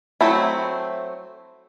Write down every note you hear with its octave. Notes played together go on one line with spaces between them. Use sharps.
F#3 A3 C4 E4